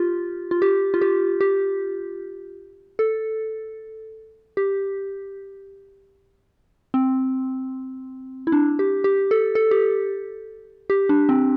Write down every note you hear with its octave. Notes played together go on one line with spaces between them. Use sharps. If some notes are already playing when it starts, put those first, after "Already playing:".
Already playing: F4 G4
F4
G4
F4
G4
G4
A4
G4
C4
E4
D4
G4
G4
A4
A4
G4
G4
D4
C4